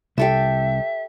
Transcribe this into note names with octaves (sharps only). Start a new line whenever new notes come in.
C2 G4 A4 E5 A5